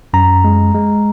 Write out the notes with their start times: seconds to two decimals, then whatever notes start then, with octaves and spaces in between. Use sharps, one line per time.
0.14 F#2 A#5
0.44 G#3
0.75 G#3